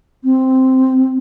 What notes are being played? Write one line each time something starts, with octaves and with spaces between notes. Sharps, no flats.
C4